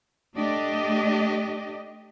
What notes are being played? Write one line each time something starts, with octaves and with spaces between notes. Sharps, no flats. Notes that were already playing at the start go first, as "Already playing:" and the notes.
A3 D4 G4 D5 D#5